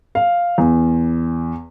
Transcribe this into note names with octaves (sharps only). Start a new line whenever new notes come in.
F5
E2